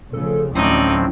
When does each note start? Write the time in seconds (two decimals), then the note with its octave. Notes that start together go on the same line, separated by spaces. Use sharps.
0.13 F1 C#3 F3 A4
0.55 D2 A2 F3 F#3 C4 C#4 D#4 D5